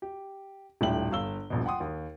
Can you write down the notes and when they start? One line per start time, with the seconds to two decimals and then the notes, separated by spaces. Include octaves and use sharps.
0.02 G4
0.81 D#1 A2 D4 E5 G5 F#7
1.11 G1 F5 E6 G7
1.50 D#1 A#1 B2
1.66 F#5 G5 C6 D#6
1.80 D#2